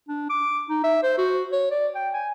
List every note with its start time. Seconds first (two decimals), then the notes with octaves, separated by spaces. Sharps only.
0.08 D4
0.30 D6
0.70 D#4
0.84 E5
1.03 C5
1.18 F#4
1.53 C#5
1.71 D5
1.95 G5
2.14 G#5